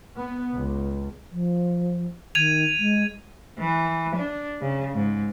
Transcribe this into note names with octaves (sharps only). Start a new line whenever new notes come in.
B3
C#2
F3
D#3 G#6 D#7 F7
G#3
E3
D4
C#3
G#2